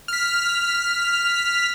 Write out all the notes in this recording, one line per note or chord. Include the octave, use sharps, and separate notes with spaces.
F6 B6